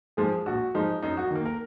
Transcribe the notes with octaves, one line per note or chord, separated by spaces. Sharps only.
G#2 F3 G#3 G#4
A#1 F#4
G#2 F3 G#3 D#4
F#2 D#4
F#4
D#3 A#3
A#4